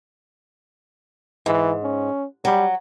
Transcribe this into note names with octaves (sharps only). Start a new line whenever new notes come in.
G#2 E3
C#4
F#3 G3